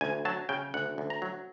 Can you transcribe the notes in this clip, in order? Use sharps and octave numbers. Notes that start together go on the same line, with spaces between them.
D2 G#5
F#3 A5
C#3 G5
D2 F#5
D2
A#5
F#3